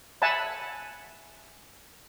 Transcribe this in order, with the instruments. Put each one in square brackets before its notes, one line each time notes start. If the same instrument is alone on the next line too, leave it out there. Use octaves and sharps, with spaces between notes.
[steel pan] E5 F#5 G#5 A5 B5